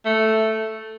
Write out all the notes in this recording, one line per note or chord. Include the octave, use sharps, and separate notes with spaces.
A3